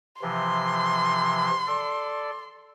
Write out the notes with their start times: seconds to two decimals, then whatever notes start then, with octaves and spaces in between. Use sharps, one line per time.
0.22 C3 E3 F3 C6
1.67 A4 D5